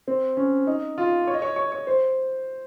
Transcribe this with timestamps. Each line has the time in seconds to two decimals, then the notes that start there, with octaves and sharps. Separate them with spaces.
0.08 C4
0.37 C#4
0.67 D#4
0.98 F4
1.27 C#5
1.34 D#5
1.42 C#5
1.56 C#5
1.72 C#5
1.87 C5